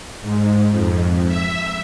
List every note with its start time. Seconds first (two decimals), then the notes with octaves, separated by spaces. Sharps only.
0.22 G#2
0.70 F2
1.28 E5